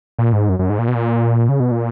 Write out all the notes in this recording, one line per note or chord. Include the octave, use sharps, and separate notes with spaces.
A#2
G#2
F#2
F#2
G#2
A#2
B2
A#2
C#3
B2
A#2